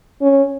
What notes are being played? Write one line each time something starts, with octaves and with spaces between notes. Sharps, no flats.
C#4